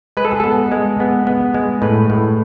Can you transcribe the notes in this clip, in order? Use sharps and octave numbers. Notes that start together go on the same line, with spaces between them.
G#3 B4
A4
G#4
B3 A4
G#3
B3
B3
G#3
A2 B4
A2